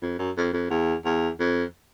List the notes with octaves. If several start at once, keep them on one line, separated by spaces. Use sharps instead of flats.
F2
F#2
F2
F2
E2
E2
F2